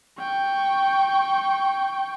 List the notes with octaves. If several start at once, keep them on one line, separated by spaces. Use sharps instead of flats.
G5 C#6